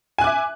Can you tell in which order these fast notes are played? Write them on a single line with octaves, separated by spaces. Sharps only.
G#5 F#6 D6 E5